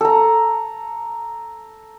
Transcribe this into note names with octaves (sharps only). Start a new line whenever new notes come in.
A4 A#5